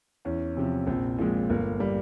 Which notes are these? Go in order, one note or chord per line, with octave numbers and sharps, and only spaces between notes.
E2 C#4
C3 F3 C4
A#1 C4
A#2 F3 G#3
G1 A#3
G3